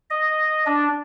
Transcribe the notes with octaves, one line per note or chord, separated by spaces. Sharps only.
D#5
D4